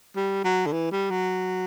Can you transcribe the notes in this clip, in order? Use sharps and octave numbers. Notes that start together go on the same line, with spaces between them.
G3
F#3
D3
E3
G3
F#3